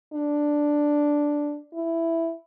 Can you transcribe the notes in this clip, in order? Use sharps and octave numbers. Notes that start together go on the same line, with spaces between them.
D4
E4